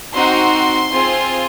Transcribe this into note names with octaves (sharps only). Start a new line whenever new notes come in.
C4 D#4 F#4 C6
C4 F4 G#4